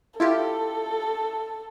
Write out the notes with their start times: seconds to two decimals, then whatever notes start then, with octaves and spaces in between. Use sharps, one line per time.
0.20 E4 F4 G4 A4